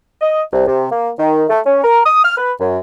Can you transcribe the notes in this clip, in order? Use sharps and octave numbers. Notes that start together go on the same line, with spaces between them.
D#5
C2
C3
A#3
D#3
A3
C#4
A#4
D#6
F6
B4
F#2